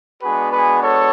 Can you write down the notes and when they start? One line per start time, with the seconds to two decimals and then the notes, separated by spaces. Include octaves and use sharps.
0.23 G#3 B3 D4 F#4 G#4 B4
0.52 G#4 B4
0.83 A4 C#5